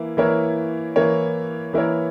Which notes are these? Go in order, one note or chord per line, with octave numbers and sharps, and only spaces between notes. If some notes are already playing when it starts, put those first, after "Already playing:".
Already playing: E3 A#3 E4
E3 A#3 E4 A#4 C#5
E3 A#3 E4 A#4 C#5
E3 A#3 E4 A#4 C#5